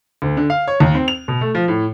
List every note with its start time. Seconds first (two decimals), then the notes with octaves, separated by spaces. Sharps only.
0.22 D2
0.37 D3
0.50 F5
0.68 C#5
0.80 D#2
0.95 C4
1.08 F7
1.28 B2
1.41 A3
1.55 F3
1.68 A2